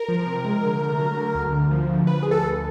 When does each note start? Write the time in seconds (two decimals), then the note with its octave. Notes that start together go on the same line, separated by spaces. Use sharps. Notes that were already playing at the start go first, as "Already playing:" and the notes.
Already playing: A#4
0.08 F3
0.26 C3
0.45 G#3
0.63 D3
0.80 A3
0.98 F#3
1.17 D3
1.35 D2
1.53 D2
1.71 F3
1.89 D2
2.07 D2 B4
2.23 D2 G#4
2.31 A4
2.43 D2